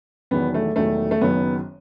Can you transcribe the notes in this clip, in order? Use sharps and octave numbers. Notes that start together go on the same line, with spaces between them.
E1 E2 D#3 F#3 B3
A3
E1 E2 D#3 F#3 A3
A3
F#1 F#2 D#3 F#3 B3